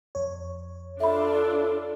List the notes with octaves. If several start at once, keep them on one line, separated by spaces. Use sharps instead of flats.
F2 C#5
D4 F4 A4 E5 B5